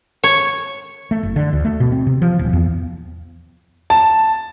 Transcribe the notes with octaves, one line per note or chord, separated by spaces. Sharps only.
C#5
A3
F#1
D3
D2
A3
B2
C4
C3
F3
D#1
E2
A5